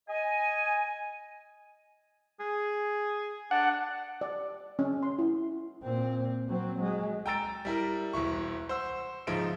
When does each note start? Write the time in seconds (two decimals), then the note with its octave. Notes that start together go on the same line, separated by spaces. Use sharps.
0.09 D#5 G#5
2.40 G#4
3.51 D4 F#5
4.21 D5
4.79 C#4
5.03 C6
5.19 E4
5.82 A#2 C4
6.49 F#3 C4
6.79 F#3 G#3
7.26 G5 G#5 A#5 E6 A6 D7
7.65 G3 E4 A#4
8.13 E1 C2 E4 C#6
8.69 C5 F#5 E6
9.27 G#2 C#3 F3 D#4 E5 D7